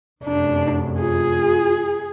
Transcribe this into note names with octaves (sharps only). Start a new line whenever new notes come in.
F1 F#2 D4
F4 G#4